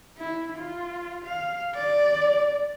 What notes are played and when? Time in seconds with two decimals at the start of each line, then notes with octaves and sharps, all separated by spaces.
0.18 E4
0.58 F4
1.25 F5
1.75 D5